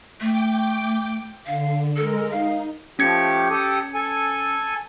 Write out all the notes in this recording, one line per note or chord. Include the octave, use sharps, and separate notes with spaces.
A3 G5 D6
D3 F5
G#3 A4 A#4
D#4 F5
F3 A3 C#4 G4 G#6 C#7
G4 A4 D#6
A4 G#5